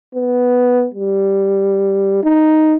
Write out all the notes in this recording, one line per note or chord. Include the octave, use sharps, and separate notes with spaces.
B3
G3
D#4